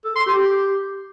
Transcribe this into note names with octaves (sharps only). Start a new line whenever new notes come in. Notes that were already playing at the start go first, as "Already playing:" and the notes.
A4
C6
G4